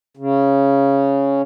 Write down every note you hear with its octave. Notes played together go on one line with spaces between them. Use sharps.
C#3